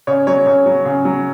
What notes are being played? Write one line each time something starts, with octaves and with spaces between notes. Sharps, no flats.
C#3 C#5
F#3 C#5
C#3 C#5
F#3
C#3
F#3